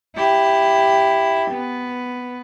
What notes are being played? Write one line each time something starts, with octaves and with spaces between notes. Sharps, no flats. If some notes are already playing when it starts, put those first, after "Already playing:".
E4 G4
B3